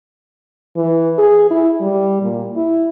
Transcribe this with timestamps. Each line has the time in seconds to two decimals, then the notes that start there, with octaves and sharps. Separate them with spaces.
0.76 E3
1.18 G#4
1.51 E4
1.81 G3
2.22 A#2
2.56 E4